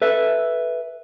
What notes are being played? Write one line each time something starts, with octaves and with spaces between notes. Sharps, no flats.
A4 B4 E5